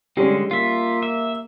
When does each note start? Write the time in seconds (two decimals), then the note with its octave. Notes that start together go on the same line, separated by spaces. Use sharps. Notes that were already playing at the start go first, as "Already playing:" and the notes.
0.17 D3 G3 G#3 C#4
0.51 A#3 F4 E5
1.03 E5